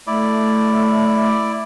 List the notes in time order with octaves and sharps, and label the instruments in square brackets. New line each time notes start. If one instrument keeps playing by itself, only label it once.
[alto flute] A3 [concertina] E4 D5